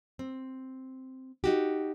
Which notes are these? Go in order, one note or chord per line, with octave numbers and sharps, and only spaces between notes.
C4
D#4 F#4 G4